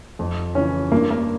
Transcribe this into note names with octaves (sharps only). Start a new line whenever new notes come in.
F2
C#3 E3 C#4
G2 A#3
A#3